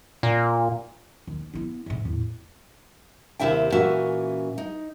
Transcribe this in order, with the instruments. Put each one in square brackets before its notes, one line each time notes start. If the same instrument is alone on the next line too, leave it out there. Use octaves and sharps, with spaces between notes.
[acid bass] A#2
[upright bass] D#2
B3 E4
G#2 C3
E2 A2
[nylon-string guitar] D#2 C3 E4 E5 G5
A#2 E3 C#4 F#4 E5
D#4